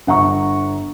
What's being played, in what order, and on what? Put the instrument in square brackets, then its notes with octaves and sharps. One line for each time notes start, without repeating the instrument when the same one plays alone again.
[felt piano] G1 F#5 A#5 C#6